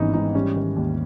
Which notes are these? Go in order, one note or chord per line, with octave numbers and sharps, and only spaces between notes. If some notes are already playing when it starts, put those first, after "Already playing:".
Already playing: G#1 G#2 E3 G3 B3 C#4 D#4
G#2 D#4
G3 C#4
D#3
D#2